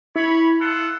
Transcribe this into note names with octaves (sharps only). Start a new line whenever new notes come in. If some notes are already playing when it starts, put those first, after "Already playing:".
E4 C#5 B5
F4 A4 F#5